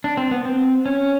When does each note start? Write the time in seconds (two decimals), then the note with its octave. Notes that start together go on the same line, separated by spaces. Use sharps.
0.04 D4
0.17 C4
0.31 B3
0.45 C4
0.86 C#4